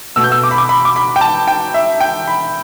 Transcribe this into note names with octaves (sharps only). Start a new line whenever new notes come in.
B2 A3 E6
G6
E6
D6
B5
D6
B5
D6
B5
G5
A5
G5
E5
G5
B5